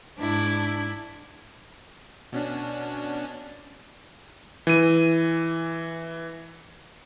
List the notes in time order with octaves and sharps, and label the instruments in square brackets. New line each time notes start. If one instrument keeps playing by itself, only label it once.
[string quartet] G#2 D4 E4
[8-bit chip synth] B2 C#4 D4
[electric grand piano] E3 D#7